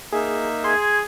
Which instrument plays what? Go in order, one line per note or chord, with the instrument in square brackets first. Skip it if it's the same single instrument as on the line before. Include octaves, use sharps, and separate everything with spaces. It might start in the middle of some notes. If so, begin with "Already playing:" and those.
[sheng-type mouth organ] A#3 D#4 E5 [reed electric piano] G#4
[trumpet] G#4 [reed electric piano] C6 [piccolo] G#6